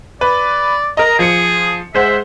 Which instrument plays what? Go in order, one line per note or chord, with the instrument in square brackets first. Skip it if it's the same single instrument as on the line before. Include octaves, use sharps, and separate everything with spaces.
[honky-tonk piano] B4 [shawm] D5
[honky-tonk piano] A#4 D#5 [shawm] A#5
[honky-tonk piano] F3 C#7 [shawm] G#4
[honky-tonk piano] G#3 C5 F#5 [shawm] E5